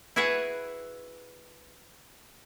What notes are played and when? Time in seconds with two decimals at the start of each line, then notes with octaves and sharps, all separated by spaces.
0.16 E4 F#4 G#4 B4 E5 F#5